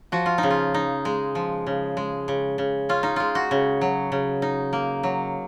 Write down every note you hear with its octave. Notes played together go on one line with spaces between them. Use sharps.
F3 F#4
F4
D#4
C#3
F4
D#4
G#3
F3
C#3
G#3
C#3
C#3
C#4 F4
D#4
G#3 F4
F#4
C#3
F#3
C#3
D#4
A#3
F#3